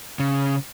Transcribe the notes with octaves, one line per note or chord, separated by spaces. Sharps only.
C#3